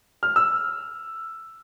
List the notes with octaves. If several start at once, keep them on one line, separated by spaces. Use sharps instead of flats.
F6
E6